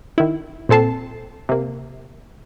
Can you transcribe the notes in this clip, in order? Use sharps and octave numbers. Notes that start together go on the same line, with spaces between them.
D#3 E4
A#2 C4 A4 A5 C7
C3 A#3